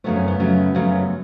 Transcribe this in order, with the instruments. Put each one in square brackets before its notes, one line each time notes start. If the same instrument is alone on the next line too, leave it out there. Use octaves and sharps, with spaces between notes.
[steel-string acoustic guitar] F#2 C#3 F#3 A3 B3
C#4
B3
F#2 C#3 F#3 A3
F#2 C#3 F#3 A3